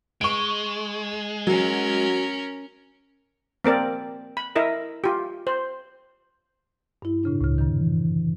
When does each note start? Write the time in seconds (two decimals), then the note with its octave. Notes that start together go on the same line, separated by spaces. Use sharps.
0.21 G#3 C#6 D7
1.47 F#3 C#4 A#4
3.64 A#3 C4 A#4 D5
4.37 B5
4.56 E4 A#4 D#5 E5
5.04 F4 G4
5.47 C5
7.02 G2 E4
7.23 A2 C#3 D4
7.41 C#2 A2 C#3
7.58 F#2 C3 D#3
7.80 E3